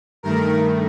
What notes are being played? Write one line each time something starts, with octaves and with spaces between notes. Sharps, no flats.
G2 D#3 A3 A#4